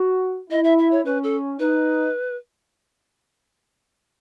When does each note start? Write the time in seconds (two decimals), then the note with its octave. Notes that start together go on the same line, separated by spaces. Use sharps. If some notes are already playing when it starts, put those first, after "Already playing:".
Already playing: F#4
0.50 E4 D#5
0.64 E5
0.78 E5
0.91 C#5
1.05 C#4 B4
1.23 A4
1.59 D#4 B4